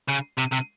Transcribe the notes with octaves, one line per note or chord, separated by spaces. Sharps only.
C#3
C3
C3